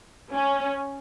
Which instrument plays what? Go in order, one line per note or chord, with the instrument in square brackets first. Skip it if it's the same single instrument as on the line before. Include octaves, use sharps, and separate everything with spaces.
[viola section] C#4